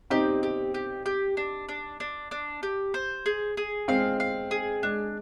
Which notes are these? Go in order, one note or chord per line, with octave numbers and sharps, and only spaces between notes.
C4 D#4 G4
G4
G4
G4
D4
D4
D4
D4
G4
C5
G#4
G#4
G#3 C4 F5
F5
G#4
G#3 D4